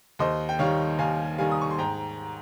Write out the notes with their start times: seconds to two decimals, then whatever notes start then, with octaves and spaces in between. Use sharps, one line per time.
0.19 D#2 C5 D#5
0.49 G5
0.59 D#3 G3 C#5 F5
0.99 D#2 F5 G#5
1.38 D#3 G3 F5 G#5
1.51 D#6
1.61 C#6
1.70 C6
1.79 G#2 G5 A#5